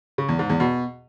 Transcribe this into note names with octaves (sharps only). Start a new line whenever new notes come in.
C#3
E2
G#2
E2
B2